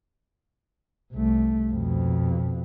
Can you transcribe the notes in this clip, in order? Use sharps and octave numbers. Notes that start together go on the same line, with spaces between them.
C2 A3
F2 B2